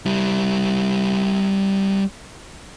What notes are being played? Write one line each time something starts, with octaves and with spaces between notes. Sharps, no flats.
G3 E4